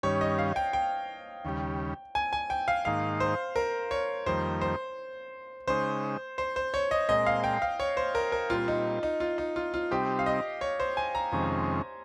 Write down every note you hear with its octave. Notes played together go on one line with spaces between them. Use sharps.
G2 D#3 G3 C#4 C#5
D#5
F5
G5
G5
D#2 C#3 G3
G#5
G#5
G5
F5
G#2 D#3 A#3 D#4 F5
C5
A#4
C#5
F2 D#3 G3 A#3 C5
C5
C#3 G#3 D#4 C5
C5
C5
C#5
D#5
A#2 G#3 C4 D#5
F5
G5
F5
C#5
C5
A#4
A#4
A#2 G3 C4 F4
D#4
D#4
F4
D#4
F4
F4
C3 G3 C4 D#4 G4
F5
D#5
C#5
C5
G#5
A#5
F2 C3 D#3 G#3 C#4